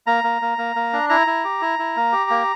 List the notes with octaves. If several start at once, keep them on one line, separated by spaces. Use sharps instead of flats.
A#3 A#5
A#3
A#3
A#3
A#3
D4
E4 A#5
E4
G4
E4
E4
A#3
G4
A#3